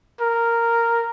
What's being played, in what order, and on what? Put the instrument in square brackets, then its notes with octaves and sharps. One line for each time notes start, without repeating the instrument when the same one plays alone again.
[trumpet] A#4